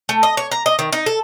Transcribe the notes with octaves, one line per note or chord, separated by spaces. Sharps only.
A3
D#5
C#5
A#5
D#5
D#3
D#4
A4